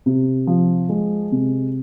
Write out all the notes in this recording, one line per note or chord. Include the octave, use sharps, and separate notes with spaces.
C3
F3
G#3
C3